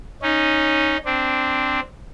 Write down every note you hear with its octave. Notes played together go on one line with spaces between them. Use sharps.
C#4 D#4
C4 D4